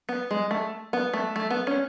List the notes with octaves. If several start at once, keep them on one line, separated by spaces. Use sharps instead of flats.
B3
G#3
A3
B3
A3
A3
B3
C#4